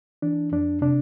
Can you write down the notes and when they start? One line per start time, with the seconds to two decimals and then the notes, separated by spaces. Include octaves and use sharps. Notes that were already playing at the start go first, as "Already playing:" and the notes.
0.22 E3 D4
0.52 F2 D4
0.81 C3 D4